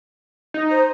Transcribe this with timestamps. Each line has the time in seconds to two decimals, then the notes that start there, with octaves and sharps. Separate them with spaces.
0.54 D#4
0.71 C5